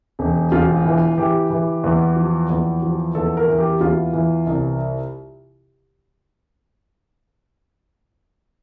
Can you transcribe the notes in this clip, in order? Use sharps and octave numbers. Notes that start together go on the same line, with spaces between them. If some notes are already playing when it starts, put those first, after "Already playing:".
E1
E1 F4
E3
E3 G4
E3
E2
F3
E2
F3
E2 A4
A#4
E3
G4
E2 F4
E3
C2